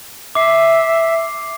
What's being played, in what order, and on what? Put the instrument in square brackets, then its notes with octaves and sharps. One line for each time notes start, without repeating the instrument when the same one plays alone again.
[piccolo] E5 [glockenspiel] D6 C7